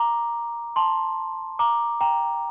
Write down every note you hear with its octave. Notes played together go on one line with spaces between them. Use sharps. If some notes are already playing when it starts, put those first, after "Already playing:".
Already playing: A#5 D6
A5 C6
A#5 D6
G5 A#5